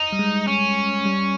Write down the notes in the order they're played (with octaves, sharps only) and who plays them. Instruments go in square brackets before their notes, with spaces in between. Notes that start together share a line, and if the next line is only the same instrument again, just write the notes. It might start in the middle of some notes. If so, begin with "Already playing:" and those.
Already playing: [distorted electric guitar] D#4
[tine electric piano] G3
G#3
[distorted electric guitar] C#4
[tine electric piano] G3